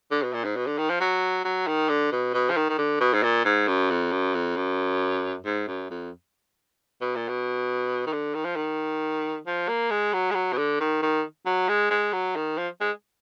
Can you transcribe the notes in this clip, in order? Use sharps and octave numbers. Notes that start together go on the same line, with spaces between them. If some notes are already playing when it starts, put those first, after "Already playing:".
D3
B2
A#2
G#2
B2
D3
D#3
F3
F#3
F#3
D#3
D3
B2
B2
F3
D#3
D#3
D3
B2
G#2
A#2
G#2
F#2
F2
F#2
F2
F#2
G#2
F#2
F2
B2
A#2
B2
D#3
D3
D#3
F3
D#3
F3
A#3
G#3
F#3
G#3
F#3
B2
D3
D#3
D#3
F#3
G#3
G#3
F#3
D#3
F3
G#3